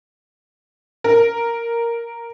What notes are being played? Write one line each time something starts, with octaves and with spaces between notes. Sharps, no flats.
A#4